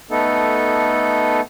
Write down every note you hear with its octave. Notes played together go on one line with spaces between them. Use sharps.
A3 B3 D#4 A4